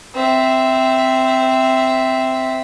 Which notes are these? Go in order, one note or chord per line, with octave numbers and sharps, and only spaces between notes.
C4 E5